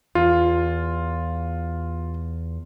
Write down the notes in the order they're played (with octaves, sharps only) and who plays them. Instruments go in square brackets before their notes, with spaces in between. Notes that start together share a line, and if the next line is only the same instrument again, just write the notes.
[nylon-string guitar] E2 [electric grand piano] F4